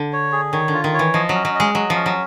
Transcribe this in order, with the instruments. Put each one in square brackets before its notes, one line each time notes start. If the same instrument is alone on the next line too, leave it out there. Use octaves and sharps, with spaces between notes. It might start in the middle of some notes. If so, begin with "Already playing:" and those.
Already playing: [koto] D3
[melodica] C#5
G#4
[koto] D#3 [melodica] C#5
[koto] D3 [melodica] F4
[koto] D#3
[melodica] C#5
[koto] E3
[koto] F3 [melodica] D#5
[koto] F#3
[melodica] C#4
[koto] F#3
[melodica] D#5
[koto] G#3
[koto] F#3 [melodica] D#5
[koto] F3
[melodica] C#4
[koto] F#3